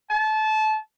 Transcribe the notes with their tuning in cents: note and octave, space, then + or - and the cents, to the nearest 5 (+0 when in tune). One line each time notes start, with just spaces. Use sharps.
A5 -25